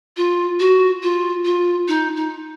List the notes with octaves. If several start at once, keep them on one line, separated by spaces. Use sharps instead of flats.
F4
F#4
F4
F4
D#4
D#4